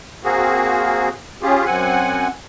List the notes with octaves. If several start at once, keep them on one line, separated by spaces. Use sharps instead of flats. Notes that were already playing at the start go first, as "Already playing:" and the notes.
A#3 C4 F#4 G#4
C#4 F4 G4 G#4
F#2 C4 F#5 G#5